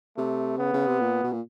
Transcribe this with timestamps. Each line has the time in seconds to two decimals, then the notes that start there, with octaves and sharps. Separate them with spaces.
0.17 C3 A3
0.58 C#3 B3
0.73 C#3
0.87 C3
1.00 A#2
1.23 B2
1.32 A#2